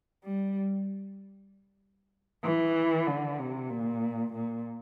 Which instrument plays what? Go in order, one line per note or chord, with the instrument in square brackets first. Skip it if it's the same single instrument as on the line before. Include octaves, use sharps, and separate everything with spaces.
[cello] G3
E3
D3
C3
A#2
A#2